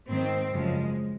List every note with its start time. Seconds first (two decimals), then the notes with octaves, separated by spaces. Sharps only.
0.08 G#2 D#3 C4
0.52 F#2 C#3 F3 G#3